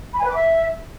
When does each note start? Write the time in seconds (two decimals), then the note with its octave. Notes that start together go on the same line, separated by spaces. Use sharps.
0.14 B5
0.19 G#5
0.24 B4
0.29 D6
0.35 E5